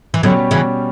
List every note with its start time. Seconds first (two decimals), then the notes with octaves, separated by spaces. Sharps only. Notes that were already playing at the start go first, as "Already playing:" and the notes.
0.14 E3
0.23 B2 D3 F#3 G3 C#4 G4
0.51 C#3 E3